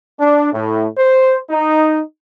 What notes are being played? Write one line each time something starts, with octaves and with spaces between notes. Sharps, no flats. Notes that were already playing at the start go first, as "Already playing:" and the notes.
D4
A2
C5
D#4